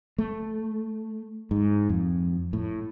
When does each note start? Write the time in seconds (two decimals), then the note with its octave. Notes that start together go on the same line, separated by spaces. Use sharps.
0.18 A3
1.51 G#2
1.89 F2
2.53 A2